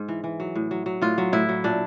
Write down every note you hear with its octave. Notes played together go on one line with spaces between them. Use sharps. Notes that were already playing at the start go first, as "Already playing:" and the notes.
Already playing: G#2
E3
E3
F#3
A2
F#3
F#3
A2 F4
F#3
A2 E4
F#3
A#2 D4